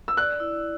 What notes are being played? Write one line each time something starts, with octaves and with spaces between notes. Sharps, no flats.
E6
D5 F#6
E4